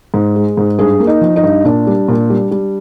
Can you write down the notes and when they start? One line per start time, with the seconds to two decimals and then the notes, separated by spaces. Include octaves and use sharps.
0.14 G#2
0.36 G#3
0.57 G#2
0.79 G2 G#4
1.00 A#3
1.07 D#4
1.21 F3
1.36 D#4
1.43 G2
1.65 A#2 D4
1.87 G3
2.08 A#2
2.30 G3
2.51 G3